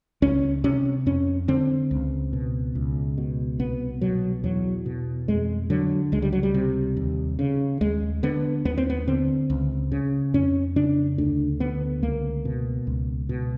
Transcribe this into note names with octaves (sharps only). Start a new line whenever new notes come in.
C#2 C#4
C3 C#4
F2 C#4
D3 C4
C#2
B2
C#2
B2
C2 B3
B2 F#3
E2 F#3
B2
F2 G#3
D3 F#3
C#2 G#3
G3
F#3
G3
C3
D#2
C#3
D#2 G#3
D3 B3
D#2 B3
C4
B3
D3 C4
C#2
C#3
F2 C#4
C#3 D4
D2 D4
D3 B3
C#2 A#3
B2
C#2
B2